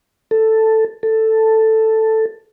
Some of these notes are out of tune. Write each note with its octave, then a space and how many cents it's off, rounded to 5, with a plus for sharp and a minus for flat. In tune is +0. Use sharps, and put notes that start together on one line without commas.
A4 +5
A4 +5